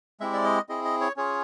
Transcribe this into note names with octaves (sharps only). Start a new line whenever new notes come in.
G#3 C4 E4 G4 E5
D5
D#5
C4 E4 G#4 D#5
D#5
C#5
C#4 F4 G#4 C#5